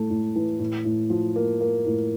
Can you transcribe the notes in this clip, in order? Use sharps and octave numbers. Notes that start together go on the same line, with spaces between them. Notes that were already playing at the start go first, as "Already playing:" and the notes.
Already playing: A2 A3
A2
E3
A2
A2
F3
A#3
A#3
A2